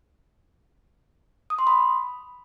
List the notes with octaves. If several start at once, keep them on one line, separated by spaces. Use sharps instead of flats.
D#6
C6
B5